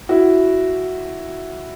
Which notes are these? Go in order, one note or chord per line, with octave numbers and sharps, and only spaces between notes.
E4 F#4